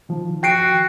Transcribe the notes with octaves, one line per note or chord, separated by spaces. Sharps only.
D#3 F3
F#4 G5 C7 D7